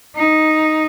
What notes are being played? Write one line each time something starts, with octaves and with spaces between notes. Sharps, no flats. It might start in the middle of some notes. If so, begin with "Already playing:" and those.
D#4